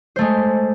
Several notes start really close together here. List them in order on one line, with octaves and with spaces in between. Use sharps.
C5 A3 G#3